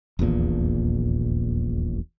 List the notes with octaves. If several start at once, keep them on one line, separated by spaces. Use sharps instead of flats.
D#1 A#1 E2 A#2